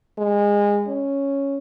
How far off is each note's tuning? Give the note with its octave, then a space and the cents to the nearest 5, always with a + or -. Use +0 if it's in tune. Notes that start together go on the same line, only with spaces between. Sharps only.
G#3 -25
C#4 +0